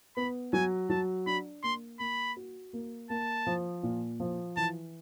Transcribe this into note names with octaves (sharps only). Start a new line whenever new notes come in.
B3 B5
F#3 G#5
F#3 A5
D4 B5
A#3 C6
A#3 B5
F#4
A#3
A#3 A5
F3
A#2
F3
E3 A5